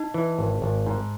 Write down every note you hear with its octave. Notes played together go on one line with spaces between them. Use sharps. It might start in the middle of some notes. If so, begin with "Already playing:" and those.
Already playing: D#4
E3
G#1
G#1
G#2